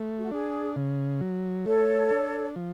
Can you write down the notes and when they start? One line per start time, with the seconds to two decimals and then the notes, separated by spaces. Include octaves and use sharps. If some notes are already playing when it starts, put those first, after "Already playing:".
Already playing: A3
0.19 F#4
0.31 D4 G#4
0.76 C#3
1.21 F#3
1.66 A3 A4 C#5
2.11 D4
2.56 F3